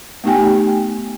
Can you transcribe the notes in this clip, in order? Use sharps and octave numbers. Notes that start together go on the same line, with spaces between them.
A3 B3 D#4 G4 G5 G#5